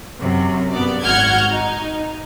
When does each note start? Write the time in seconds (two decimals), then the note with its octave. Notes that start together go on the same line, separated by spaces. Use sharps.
0.20 F#2 C3
0.72 G2 B3 D5
1.03 G#1 F#4 F#5 F6 G6 G#6
1.50 D#4